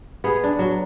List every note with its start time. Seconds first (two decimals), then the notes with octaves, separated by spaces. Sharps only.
0.24 B3 G#4
0.44 D4
0.59 F#3